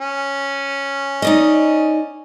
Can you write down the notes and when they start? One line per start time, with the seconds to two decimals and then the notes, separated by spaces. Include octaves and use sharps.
0.01 C#4
1.22 D#4 D5 D#5